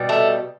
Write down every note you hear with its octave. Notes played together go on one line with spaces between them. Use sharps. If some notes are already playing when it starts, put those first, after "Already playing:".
Already playing: B2 G3
A3